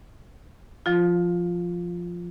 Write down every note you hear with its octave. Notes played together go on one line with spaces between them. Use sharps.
F3 F4